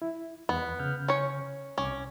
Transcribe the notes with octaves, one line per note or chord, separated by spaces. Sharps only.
E4
E2 B3
C#3 F6 G6
C#4 C#5
C2 C#4 D6